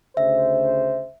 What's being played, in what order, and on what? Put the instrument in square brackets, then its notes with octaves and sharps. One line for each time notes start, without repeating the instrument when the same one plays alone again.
[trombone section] D2 C#3 C5 [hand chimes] E5